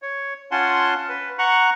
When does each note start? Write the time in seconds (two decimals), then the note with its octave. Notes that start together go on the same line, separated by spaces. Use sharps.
0.02 C#5
0.51 C#4 F4 F#5 G#5 A5 C6
1.09 B4
1.39 F#5 A#5 C#6 F#6